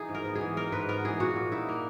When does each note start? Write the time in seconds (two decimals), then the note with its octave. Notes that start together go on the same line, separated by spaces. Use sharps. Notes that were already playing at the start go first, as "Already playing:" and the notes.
Already playing: E3 D#4 G#4
0.09 G#2
0.15 A#4
0.25 B3
0.35 G#4
0.41 E3
0.57 D#4 A#4
0.72 G#2 B4
0.89 B3 A#4
1.05 E3 G#4
1.20 A#2 F#4
1.36 A#2
1.52 D#4 E4
1.69 A#3